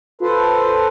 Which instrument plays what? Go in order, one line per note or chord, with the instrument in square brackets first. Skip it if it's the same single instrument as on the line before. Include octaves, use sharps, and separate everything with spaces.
[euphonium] F4 [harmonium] A4 B4 C5